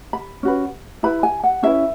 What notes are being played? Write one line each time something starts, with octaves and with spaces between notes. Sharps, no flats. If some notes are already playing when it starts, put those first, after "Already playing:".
B5
C#4 F#4 B4
E4 B4 B5
G#5
F#5
C#4 E4 B4 E5